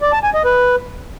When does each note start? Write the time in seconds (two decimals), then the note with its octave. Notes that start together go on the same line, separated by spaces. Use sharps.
0.02 D5
0.13 A5
0.23 G#5
0.34 D#5
0.45 B4